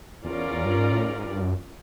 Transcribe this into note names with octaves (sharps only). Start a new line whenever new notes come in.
E2 C#4 F4 A#4 D5
G2
G#2
A2
G#2
G2
F#2